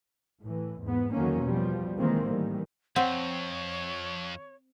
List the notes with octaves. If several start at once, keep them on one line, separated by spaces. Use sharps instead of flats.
A2 E3
E2 G#2 B3
E2 D3 D#3 F#3 A#3 C#4
B2 F3 G3
D#3 E3 G#3 A#3 C4
A2 D#3 E3 G3
F2 C4 C#5 F#5